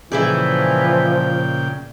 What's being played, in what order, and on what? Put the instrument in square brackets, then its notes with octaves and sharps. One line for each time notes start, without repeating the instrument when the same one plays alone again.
[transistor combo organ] A#2 C#3 G5 [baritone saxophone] E3 [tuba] F3 [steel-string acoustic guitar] E4 G#4 D5